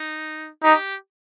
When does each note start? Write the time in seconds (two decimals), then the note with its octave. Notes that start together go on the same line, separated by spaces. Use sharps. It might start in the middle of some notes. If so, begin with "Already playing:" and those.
Already playing: D#4
0.63 D#4 G4